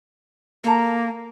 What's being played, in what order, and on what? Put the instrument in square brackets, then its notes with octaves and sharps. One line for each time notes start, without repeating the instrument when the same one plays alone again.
[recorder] A#3 [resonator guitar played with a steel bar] A4 A#5